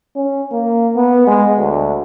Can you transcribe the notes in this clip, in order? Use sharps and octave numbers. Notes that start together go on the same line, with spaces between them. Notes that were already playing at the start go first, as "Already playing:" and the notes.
C#4
A#3
B3
G#3
D2